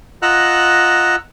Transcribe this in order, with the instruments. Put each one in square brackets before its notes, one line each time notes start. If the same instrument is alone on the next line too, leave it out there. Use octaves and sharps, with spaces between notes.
[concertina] F4 D#5 F#5 A#5 E6 F#6